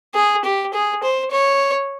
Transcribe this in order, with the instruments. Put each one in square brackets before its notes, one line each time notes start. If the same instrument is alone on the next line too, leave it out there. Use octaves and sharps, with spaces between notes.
[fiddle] G#4
G4
G#4
C5
C#5